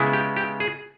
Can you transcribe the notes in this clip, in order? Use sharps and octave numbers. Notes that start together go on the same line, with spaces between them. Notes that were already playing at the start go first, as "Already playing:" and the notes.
Already playing: C#3 G#3 B3 E4
G4
G4
G#4